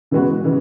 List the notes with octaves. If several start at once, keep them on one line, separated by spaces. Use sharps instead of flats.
C#3 E3 G#3 B3 F#4
C#3 E3 G#3